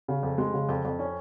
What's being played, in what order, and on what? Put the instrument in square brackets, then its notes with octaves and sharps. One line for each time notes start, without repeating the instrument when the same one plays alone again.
[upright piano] C#3
F2
G#3
C#3
F2
F2
C#4